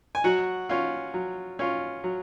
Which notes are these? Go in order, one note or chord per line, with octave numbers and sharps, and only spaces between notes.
G#5
F#3 F#4 F#5
C#4 F4
F#3
C#4 F4
F#3